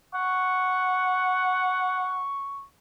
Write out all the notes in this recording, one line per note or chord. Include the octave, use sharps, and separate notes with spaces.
F#5 C#6